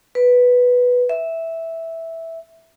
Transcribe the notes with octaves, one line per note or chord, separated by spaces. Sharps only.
B4
E5